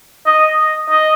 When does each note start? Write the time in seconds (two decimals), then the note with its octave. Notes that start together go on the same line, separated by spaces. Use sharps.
0.26 D#5
0.90 D#5